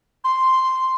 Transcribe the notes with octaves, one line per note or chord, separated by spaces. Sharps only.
C6